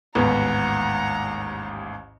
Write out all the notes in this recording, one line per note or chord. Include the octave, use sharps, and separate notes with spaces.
A1 D#2 G#2 B3 F#5 A#5